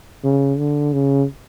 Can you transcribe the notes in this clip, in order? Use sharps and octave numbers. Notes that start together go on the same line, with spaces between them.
C#3
D3
C#3